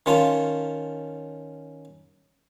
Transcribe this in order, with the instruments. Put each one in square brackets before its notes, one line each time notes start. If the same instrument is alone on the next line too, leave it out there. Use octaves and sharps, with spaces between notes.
[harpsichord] D#3 C#4 F4 A5